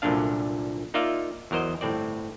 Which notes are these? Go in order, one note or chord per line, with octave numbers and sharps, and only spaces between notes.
C2 F#2 A#2 D3 D4 F5
A#3 D#4 F4 D5 E5 F5
E2 F#3 A#4 C5 D#5
G1 A2 C4 D5